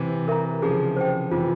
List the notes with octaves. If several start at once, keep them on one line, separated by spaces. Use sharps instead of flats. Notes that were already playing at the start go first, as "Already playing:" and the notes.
Already playing: C3 E3
A#4 E5 A#5
C#3 F3 G#4
C5 G5
C3 E3 F4